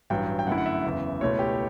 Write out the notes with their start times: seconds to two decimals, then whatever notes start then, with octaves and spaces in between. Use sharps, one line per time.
0.10 A1 G2 F#3 G5
0.39 G5
0.47 F#2 D3 A3 E4 F#5
0.58 F#5
0.66 E5
0.84 F#1 E2 C#3
1.20 C#2 B2 A3 C#4 E4 C#5
1.39 G4